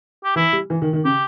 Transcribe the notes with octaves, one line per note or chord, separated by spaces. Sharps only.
G4
E3 E4
G3
E3
D#3
D#3
C#3 G4